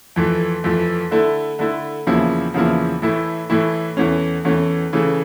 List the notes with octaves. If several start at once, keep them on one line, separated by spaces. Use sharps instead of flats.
F2 E3 A3
F2 E3 A3
D3 A3 E4
D3 A3 E4
E2 C#3 F3 A#3 E4
E2 C#3 F3 A#3 E4
A2 E3 A3 E4
A2 E3 A3 E4
E2 E3 A3 C#4
E2 E3 A3 C#4
C#3 E3 A3